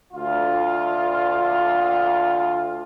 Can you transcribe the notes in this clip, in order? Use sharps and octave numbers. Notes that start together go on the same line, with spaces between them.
D2 F4